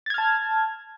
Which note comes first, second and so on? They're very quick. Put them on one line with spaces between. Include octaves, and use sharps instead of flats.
A6 G#6 F6 A5